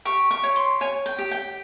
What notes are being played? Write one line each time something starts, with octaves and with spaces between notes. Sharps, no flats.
G4 C#6
C#6
C#5
C6
C#5 G#5
G5
G4
G5